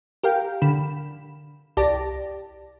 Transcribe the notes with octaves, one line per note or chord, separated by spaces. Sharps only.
G4 A#4 F5 G5
D3 B5 E7
C2 G4 D5 A5 A#6